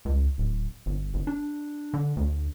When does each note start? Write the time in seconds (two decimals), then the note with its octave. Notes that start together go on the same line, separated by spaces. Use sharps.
0.05 C#2
0.38 D1
0.86 G1
1.14 G1
1.27 D4
1.94 D3
2.17 D2